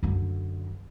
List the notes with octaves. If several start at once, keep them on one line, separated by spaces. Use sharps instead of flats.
F#2 D3